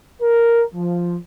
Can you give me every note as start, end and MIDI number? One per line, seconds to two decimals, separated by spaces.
0.22 0.62 70
0.75 1.17 53